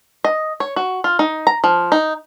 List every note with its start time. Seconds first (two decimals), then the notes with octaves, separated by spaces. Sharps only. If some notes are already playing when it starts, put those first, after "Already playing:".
0.24 D#5
0.60 C#5
0.76 F#4
1.04 F4
1.19 D#4
1.47 A#5
1.64 F3
1.92 D#4